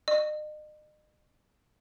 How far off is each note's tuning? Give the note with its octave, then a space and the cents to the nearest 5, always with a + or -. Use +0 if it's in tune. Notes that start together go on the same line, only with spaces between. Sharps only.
D#5 -40